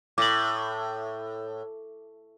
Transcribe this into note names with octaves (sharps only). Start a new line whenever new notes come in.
A2 D6 F#7